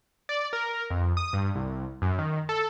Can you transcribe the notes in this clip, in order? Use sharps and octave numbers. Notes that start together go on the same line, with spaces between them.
D5
A#4
F2
D#6
G2
C2
F#2
D#3
A4